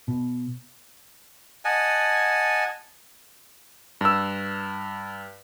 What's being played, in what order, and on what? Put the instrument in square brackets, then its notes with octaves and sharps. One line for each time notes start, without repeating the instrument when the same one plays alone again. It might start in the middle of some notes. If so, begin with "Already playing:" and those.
[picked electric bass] B2
[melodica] D#5 F#5 G#5 A5
[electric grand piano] G2 E6